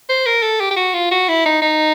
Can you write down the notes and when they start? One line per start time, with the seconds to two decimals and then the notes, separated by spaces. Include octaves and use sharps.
0.09 C5
0.26 A#4
0.42 A4
0.61 G4
0.71 G4
0.77 F#4
0.94 F4
1.11 F#4
1.29 E4
1.46 D#4
1.62 D#4